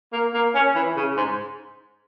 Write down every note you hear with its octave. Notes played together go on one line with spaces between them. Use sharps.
A#3
A#3
C#4
E3
C#3
G#2